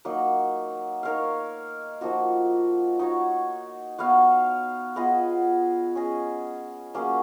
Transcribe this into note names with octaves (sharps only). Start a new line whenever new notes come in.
F#3 A#3 D#4
D#4 A#4 C#5 F5
F3 A#3 D#4 F#4
D#4 F#4 C#5
B3 F#4 C#5 F5
B3 F4 G#4 D#5
C#4 G#4 D#5
F#3 A#3 C#4 G#4